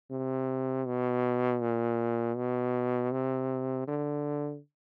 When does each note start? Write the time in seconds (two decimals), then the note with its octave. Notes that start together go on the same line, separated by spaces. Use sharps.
0.11 C3
0.86 B2
1.61 A#2
2.37 B2
3.12 C3
3.88 D3